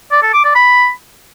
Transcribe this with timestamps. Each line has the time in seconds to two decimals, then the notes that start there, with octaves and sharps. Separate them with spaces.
0.12 D5
0.22 A4
0.33 D6
0.44 D5
0.55 B5